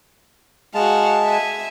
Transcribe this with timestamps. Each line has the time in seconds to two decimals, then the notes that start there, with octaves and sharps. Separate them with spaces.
0.75 G#3 F#4 F5 A5
1.24 E5 G#5